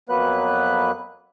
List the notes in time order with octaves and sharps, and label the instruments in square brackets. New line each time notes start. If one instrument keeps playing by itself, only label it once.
[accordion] F2 F#3 A#3 B3 B4 F#6